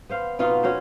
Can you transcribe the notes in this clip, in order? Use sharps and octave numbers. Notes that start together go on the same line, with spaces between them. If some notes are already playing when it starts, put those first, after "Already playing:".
B3 C5 F5
B2 B3 D#4 F4
C#4 F#4 A#4 C5